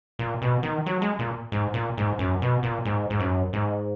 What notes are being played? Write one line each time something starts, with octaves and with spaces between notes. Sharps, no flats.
A#2
B2
D#3
F#3
G#3
A#2
G#2
A#2
G#2
F#2
B2
A#2
G#2
G#2
F#2
G#2